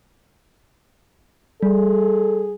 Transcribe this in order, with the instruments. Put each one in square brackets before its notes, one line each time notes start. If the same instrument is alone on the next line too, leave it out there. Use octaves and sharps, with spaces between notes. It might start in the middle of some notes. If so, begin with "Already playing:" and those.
[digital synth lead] G3 [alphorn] G#4 [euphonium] A4